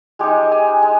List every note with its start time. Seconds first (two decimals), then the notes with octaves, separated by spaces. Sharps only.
0.19 G#3 D#4 G4
0.52 G#5
0.82 G#3